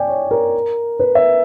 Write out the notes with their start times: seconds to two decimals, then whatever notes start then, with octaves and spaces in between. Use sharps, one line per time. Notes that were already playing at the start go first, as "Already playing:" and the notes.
Already playing: D5 G5 G#5
0.08 C#5
0.31 A#4
1.00 B4
1.15 E5